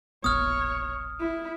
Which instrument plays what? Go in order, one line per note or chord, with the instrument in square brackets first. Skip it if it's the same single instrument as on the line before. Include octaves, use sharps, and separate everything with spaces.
[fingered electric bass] E1 A#1 B3 [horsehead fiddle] C#5 [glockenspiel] D#6 F6
[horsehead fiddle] E4